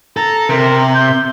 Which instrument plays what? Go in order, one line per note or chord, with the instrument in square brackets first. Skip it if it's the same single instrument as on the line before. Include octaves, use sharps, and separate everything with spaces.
[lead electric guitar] A4 [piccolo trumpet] A#5
[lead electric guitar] C3 [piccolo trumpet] A#4
[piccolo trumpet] G6